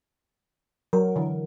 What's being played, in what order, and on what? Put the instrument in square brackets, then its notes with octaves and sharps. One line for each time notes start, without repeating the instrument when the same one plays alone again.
[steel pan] F#3 [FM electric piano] A#4
[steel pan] D3 E3